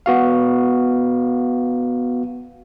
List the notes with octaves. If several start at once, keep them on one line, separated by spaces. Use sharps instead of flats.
B3 F#4 F5